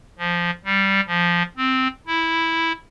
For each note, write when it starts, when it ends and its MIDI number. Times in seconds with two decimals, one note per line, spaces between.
0.19 0.51 53
0.65 1.01 55
1.08 1.43 53
1.57 1.87 60
2.07 2.72 64